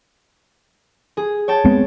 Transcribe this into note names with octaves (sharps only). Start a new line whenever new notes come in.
G#4
C#5 G5 A5
G#3 B3 C4